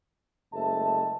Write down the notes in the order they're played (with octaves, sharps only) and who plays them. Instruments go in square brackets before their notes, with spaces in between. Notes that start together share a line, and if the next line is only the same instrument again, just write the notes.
[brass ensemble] F#1 G#3 A3 E5 A5